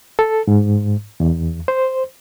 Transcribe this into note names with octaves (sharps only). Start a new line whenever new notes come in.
A4
G#2
E2
C5